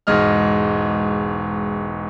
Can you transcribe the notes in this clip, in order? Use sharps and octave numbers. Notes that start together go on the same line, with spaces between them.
E1 G#2 D#5 F6